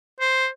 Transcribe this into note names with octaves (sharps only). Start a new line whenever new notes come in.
C5